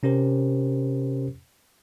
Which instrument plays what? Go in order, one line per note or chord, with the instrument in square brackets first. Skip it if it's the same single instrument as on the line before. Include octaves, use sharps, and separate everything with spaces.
[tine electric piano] C3 C#4 G4 A#4 C5